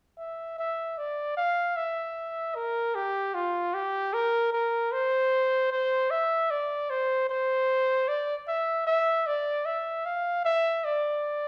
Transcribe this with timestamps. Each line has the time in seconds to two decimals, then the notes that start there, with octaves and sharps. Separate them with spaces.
0.18 E5
0.58 E5
0.98 D5
1.37 F5
1.77 E5
2.55 A#4
2.95 G4
3.34 F4
3.74 G4
4.14 A#4
4.53 A#4
4.92 C5
5.71 C5
6.11 E5
6.50 D5
6.90 C5
7.29 C5
8.08 D5
8.48 E5
8.87 E5
9.27 D5
9.66 E5
10.06 F5
10.45 E5
10.85 D5